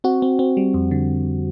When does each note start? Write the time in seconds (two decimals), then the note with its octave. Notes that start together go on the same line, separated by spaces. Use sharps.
0.04 C4 F#4
0.22 C4
0.39 C4
0.57 G3
0.74 F2
0.91 D3